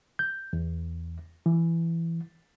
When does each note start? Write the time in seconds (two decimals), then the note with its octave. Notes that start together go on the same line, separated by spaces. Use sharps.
0.19 G6
0.53 E2
1.46 E3